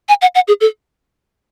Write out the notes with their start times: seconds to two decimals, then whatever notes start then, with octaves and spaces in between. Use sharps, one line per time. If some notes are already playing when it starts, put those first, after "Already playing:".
0.09 G#5
0.22 F#5
0.35 F#5
0.48 G#4
0.61 A4